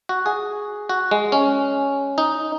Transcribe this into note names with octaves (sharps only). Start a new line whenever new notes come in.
F#4
G#4
F#4
G#3
C#4
D#4